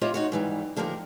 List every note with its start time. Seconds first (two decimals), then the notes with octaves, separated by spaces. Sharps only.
0.01 E4 F4 G4 C5 C#5 D#5
0.14 D#4 F#4 C#5
0.32 G#2 E3 G3
0.76 D3 F3 A#3 G4 A#4